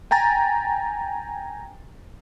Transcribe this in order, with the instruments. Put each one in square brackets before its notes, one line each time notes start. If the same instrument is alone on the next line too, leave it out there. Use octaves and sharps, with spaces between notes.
[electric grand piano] G5 G#5 A#5 A6